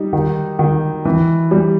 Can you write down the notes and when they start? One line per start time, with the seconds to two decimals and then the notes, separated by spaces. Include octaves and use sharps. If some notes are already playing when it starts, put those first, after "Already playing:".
Already playing: G3 D#4
0.13 D#3
0.59 D#3
1.05 E3
1.51 G3